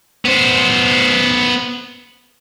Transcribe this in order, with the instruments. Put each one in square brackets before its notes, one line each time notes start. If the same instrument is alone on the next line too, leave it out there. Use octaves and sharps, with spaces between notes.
[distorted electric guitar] B3 C5